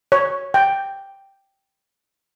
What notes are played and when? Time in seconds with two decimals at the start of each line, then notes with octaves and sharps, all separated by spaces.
0.12 C#5
0.54 G5